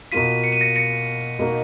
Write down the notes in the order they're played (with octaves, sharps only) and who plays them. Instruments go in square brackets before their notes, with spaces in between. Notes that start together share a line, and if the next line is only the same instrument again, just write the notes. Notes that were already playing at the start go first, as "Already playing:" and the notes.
[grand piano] B2 A#3 F4 [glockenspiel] B6 D#7
[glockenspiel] C#7
D#7
A#6 C#7
A#6 C#7
[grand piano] B2 A#3 D#4 F#4